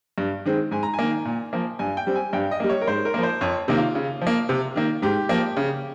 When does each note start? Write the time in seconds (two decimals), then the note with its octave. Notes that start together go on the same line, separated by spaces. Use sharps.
0.18 G2
0.45 D#3 G#3 C4
0.71 G#2 G#5
0.83 A#5
0.94 G#5
0.99 D#3 A#3
1.25 A#2
1.53 F3 A#3
1.79 G2 G#5
1.97 G5
2.07 G3 C4
2.16 G#5
2.33 G2 G5
2.51 D#5
2.60 G3 A#3
2.69 C#5
2.82 A#4
2.87 G#2 C5
3.05 A#4
3.14 F3 A#3
3.23 C5
3.41 F2 C#5
3.68 C3 D#3 A#3
3.77 F4
3.95 C#3
4.21 F3
4.27 A#3
4.49 C3
4.76 D#3 A#3
5.02 G#2 G4
5.29 F3 A#3
5.57 C#3